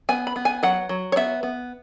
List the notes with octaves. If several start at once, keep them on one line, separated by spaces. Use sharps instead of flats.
B3 G#5
B5
B3
G#5
F#3 F#5
F#3
C#5
B3 E5
B3